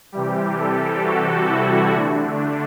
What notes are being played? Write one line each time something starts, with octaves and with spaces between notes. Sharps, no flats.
C3 E3 G3 G4
A4
F#4
E4
D3 A3 D4